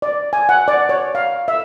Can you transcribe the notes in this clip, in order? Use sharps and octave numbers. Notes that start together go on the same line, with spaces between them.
D5
G#5
F#5
D5
C#5
F5
E5